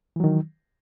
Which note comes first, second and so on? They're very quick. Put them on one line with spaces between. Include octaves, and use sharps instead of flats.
E3 F#3 D#3